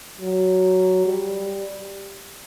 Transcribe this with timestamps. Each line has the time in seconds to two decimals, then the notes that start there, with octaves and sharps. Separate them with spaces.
0.21 F#3
1.05 G3